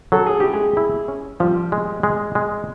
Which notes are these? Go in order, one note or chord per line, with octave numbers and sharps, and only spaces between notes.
F#3 A4
G#4
E4 G4
G#3 G#4
E4
C#4
F3 G3 G4
G#3
G#3
G#3